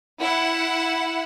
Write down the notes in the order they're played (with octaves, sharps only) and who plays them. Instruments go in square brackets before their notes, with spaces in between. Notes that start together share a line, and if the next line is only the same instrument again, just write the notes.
[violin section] E4 F#5